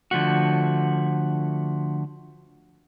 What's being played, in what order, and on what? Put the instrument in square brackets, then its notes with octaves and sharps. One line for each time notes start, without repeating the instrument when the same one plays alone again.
[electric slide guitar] D3 F3 A3 F#4